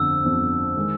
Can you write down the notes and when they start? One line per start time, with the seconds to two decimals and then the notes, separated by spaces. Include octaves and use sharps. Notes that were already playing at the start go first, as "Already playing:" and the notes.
Already playing: G1 F2 D3 E6
0.24 G1 F2 D3
0.77 D#3 G#3